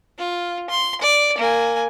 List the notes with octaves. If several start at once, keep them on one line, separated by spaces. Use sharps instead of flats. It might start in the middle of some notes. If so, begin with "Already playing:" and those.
F4
C6
D5
A#3 G#5